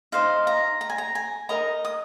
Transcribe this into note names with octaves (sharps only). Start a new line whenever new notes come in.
D#4 C5 D#5 F5
A#5
A#5
G#5
A#5
G#5
D#4 A#4 D#5 A#5
D#6